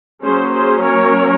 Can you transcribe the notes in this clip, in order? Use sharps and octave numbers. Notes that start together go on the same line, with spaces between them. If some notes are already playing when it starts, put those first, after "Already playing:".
F#3 A#3 C#4 G#4 C5
G#4 C5
A#4 C#5